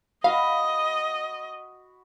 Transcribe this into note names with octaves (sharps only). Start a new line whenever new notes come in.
F#4 D#5 F5 B5